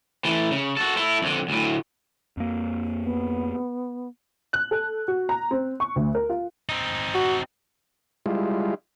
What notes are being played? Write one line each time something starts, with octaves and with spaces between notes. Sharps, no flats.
E3 A3
C#3
F#4 A4
E4 A4
F2 D3
D2 A2
F2 A#3
B3
F#6
A4
F#4
A#5
C4
C#6
D2
A#4
F4
C4 D#4
F#4
G3 G#3 E4 F4